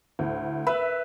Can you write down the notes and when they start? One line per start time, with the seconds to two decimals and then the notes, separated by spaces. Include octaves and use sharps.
0.19 D2 A2
0.67 B4 E5